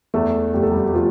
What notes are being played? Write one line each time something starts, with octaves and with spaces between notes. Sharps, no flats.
E2 A3 A4
F1 G4
A4
G3 G4
G4
F3 F4